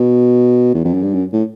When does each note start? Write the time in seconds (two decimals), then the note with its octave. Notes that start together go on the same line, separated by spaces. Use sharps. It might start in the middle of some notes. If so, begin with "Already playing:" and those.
Already playing: B2
0.74 E2
0.84 F2
0.94 F#2
1.03 G2
1.13 F#2
1.33 A2